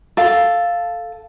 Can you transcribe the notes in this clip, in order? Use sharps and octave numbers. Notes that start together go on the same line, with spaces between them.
A4 F5